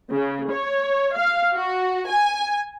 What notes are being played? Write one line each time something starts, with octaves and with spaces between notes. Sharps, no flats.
C#3
C#5
F5
F#4
G#5